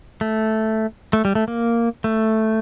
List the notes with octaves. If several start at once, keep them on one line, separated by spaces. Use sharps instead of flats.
A3
A3
G3
A3
A#3
A3